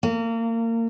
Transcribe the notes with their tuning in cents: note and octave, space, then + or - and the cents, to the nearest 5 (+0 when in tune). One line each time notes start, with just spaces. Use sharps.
A#3 -30